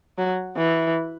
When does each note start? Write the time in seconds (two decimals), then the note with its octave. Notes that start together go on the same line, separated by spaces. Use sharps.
0.18 F#3
0.56 E3